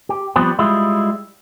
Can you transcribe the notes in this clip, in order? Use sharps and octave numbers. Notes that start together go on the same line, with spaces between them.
G4
F3 G3 B3 C4 G4 B4
G3 G#3 E4 F4